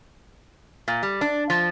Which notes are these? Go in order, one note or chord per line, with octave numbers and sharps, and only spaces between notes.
A#2
G3
D4
F3